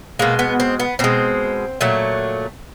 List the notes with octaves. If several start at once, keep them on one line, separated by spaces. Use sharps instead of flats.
B2 G#3 A#3
B3
C4
B3
B2 G#3 C4
A#2 F#3 A3